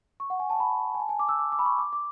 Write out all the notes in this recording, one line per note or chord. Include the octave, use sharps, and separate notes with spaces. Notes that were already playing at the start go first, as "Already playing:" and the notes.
C#6
F#5
G#5
A5
B5
G#5
A5
G#5
D6
E6
D6
D6
B5
C#6
D6
D6